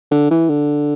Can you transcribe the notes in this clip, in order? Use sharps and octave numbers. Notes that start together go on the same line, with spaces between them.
D3
E3
D3